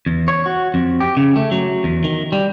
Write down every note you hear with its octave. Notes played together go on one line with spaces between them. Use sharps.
E2
C#5
F#4
F2
G4
C#3
A3
F#3
E2
D#3
G3